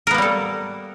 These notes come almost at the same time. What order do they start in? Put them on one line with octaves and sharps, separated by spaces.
A#4 B3 A#3 G3 A4